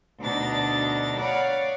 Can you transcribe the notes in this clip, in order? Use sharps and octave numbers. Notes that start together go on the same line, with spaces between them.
D2 B2 D4 D#4 A6
C#5 D5 F5 F#5 B5